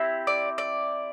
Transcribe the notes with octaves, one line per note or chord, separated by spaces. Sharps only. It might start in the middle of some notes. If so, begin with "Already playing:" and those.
Already playing: C4 E4 G4
D5
D5